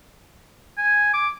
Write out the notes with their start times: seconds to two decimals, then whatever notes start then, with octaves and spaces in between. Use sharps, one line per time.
0.78 G#5
1.14 D6